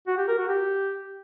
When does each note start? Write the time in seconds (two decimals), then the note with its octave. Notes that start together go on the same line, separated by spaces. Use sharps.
0.07 F#4
0.17 G4
0.28 A#4
0.38 F#4
0.48 G4